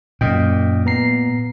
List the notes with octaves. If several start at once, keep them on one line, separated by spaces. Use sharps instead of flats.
F#2 A#2 D#5 G5
B3 A#5 C7